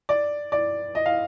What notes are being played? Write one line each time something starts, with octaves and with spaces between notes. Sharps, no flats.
D5
D5
D#5
F5